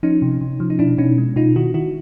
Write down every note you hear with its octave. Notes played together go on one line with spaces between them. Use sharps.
F3 C#4 D#4
C3
C3
F3
D#4
B2 D4 E4
B2 C#4 D#4
G#3
B2 D#4 F4
D#3 E4 F#4
D#3 E4 F#4